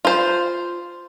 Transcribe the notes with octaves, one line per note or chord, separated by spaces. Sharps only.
F4 C5